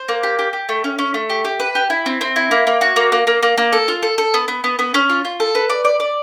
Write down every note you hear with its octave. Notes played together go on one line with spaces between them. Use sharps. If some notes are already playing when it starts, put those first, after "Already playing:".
Already playing: C5
A#3
G4
G4
G4
A3
C#4
C#4
A3
G4
G4
B4
G4
E4
C4
C4
E4
A#3
A#3
F#4
A#3
A#3
A#3
A#3
A#3
A4
F4
A4
A4
B3
B3
B3
B3
C#4
F4
F4
A4
B4
D5
D5
D5